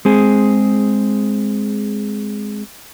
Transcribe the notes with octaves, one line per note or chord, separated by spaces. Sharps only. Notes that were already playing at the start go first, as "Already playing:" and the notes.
G#3 C4 G#4